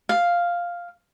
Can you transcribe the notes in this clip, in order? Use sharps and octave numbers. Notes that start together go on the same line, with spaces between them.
F5